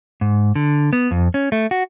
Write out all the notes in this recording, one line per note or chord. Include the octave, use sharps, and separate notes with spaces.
G#2
D3
B3
F2
C#4
A3
F#4